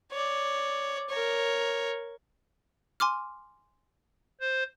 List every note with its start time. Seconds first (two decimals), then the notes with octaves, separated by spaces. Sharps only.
0.12 C#5 D5
1.10 A#4 C#5
3.00 G#5 C6 D6 F6
4.40 C5